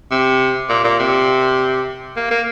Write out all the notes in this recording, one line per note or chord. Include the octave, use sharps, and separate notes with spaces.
C3
A#2
A#2
C3
A#3
A#3